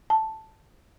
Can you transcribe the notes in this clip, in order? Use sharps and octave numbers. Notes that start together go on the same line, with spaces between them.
A5